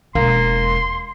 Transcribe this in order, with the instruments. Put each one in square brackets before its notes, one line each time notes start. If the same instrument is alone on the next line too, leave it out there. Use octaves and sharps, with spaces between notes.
[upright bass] E1 [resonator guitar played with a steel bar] A#3 [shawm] C6